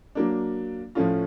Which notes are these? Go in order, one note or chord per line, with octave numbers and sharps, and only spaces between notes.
F#3 A#3 D4
A2 F3 A3 C#4 F4